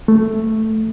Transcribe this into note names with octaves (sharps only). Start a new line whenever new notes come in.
A3